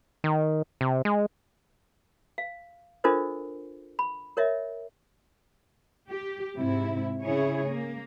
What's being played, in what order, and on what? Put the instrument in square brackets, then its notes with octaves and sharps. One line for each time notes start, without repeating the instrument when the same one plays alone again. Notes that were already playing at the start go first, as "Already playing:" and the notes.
[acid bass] D#3
C3
G#3
[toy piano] F5
D4 F4 A4 A#4 C5 D#5
B5
A#4 C#5 D#5 E5
[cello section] G4
G#2 C3 E4
C#3 E4 G#4 C#5
A#3